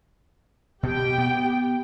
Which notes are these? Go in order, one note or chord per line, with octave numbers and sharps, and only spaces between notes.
B2 G4 G5
B3